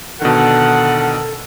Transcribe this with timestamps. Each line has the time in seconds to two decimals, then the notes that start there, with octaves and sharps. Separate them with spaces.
0.22 B2 D3 D#3 A4 F#5